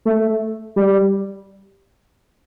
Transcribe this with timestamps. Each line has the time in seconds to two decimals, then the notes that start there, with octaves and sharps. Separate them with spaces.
0.05 A3
0.76 G3